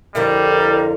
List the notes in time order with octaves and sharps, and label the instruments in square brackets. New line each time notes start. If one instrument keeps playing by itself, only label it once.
[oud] F2 D3 E4 [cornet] G3 [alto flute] A#4